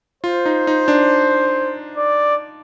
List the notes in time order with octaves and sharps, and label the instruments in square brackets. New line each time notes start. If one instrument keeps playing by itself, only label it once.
[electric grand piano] F4 [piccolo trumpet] C5
[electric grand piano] D#4
D#4
D4
[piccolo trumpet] D5